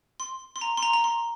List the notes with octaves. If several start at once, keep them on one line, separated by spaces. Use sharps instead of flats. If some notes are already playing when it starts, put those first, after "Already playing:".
C6
C6
A#5
C6
A#5
A#5
C6